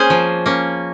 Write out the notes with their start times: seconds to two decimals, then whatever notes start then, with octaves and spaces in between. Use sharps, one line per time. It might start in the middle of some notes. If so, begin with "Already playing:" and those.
Already playing: A#3 C#4 F4 G#4 C5
0.10 F3
0.46 A#3 C#4